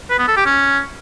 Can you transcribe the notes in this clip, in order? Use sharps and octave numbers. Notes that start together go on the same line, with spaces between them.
B4
B3
A4
G4
C#4